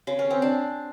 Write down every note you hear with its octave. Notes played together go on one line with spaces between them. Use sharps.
C#3
C#4
C4
D4